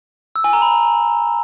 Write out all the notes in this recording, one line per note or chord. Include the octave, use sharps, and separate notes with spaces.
E6
G#5
A#5
B5